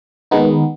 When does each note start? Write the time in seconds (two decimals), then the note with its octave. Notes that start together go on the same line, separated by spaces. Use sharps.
0.31 D#3 G#3 B3 D#4